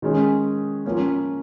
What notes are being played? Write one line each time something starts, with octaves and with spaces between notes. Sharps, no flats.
D#3 G#3 C#4 G#4
F3 A#3 C#4